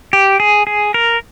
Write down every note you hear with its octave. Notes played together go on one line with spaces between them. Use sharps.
G4
G#4
G#4
A#4